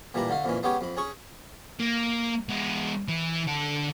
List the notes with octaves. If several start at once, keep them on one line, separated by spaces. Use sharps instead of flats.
A#2 E3 G3 D4 A#5 B5
D3 A3 F5
F2 A#2 E3 C#4
G#3 B3 C#4 G4 C#5
F2 B5
C#4 G#4 C#6
A#3
G#3 B3
E3
D3 A4